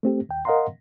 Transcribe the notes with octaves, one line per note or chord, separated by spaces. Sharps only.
A3 C4 G4
D#2 G5
A#4 D#5 F5 F#5 A#5 C6